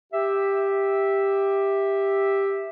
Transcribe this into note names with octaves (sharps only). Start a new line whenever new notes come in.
G4 E5